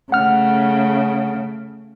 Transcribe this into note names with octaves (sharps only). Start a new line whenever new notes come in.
C#3 A3 F#5 F6